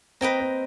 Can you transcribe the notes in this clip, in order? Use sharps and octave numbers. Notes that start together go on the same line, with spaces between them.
C4 B4 D#5 G5 A#5
C4